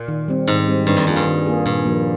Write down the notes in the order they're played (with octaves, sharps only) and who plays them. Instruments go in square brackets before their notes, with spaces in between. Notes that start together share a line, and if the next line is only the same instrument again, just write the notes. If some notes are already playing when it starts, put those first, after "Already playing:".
Already playing: [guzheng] A#2
[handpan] D#3
G3 C4
[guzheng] G#2 [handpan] D#3
[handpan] G3 C4
[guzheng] G2 [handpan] D#3
[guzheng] F2
[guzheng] F2 [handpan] A#3 F4 G#4
[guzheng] G2
[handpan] D#3
A#3 F4 G#4
[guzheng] G2 [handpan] A#2
[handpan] F3 A#3